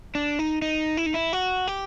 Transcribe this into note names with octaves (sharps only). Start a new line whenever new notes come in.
D4
D#4
D#4
E4
D#4
E4
F#4
G4